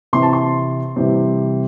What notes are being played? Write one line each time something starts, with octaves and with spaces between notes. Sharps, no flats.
C3 E3 C4 C6
A5
C6
C3 E3 G3 C4